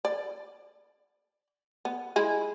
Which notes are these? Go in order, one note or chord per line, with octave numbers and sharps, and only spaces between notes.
D5
B3
G#3 E4 G#4